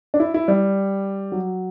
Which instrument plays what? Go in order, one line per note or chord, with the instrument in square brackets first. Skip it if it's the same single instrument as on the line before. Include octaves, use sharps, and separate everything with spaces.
[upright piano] D4
E4
E4
G3
F#3